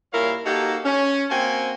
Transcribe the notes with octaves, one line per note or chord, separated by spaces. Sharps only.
A#2 G3 E4 A#4 C#5 F5
A#3 D#4 F#4 G4 A4
C#4
A#3 C4 F#4 G5 G#5